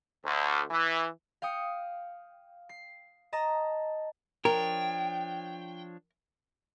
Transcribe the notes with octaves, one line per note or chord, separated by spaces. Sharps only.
D2
E3
F5 G5 D#6 C#7
C7
D#5 A5 A#5
F3 D4 A#4 C#5 G5